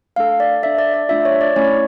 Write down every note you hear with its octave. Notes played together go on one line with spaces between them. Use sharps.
A3 D4 A4 F5
D5
D4 A4 E5
D5
D5
A3 D4 F4 E5
C#5
D5
A3 C#4 E4 C#5